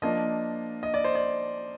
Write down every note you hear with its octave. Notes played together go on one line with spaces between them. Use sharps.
F3 A#3 D4 D#5
D#5
D5
C5
D5